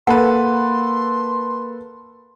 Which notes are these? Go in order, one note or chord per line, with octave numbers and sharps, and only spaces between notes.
A#3 A4 B4 F#5 C6